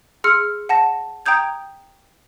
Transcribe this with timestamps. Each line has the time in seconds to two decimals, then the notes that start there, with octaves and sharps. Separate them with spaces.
0.24 G#4 C6 E6 F6 C#7
0.69 F#5 A5 A#6
1.26 G5 A#5 D#6 G6 G#6